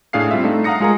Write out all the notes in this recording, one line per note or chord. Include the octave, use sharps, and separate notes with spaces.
A2 D4 G#4 F5 C7
G3 C4 F4 E5
A3 D4 D#4 F4
F5 F#5 A#5 D#6 A#6 C#7
G#3 F4 G#4 A#4 A#5